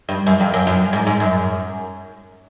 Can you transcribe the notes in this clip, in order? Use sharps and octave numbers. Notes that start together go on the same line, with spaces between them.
G2
F#2
F2
F#2
F#2
G#2
G#2
F#2